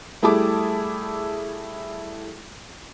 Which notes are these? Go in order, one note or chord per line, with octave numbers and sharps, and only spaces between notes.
G3 A3 E4 G#4 A5 D6